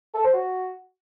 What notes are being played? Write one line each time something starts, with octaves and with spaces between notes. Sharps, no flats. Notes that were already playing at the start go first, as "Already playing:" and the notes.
A4
C5
F#4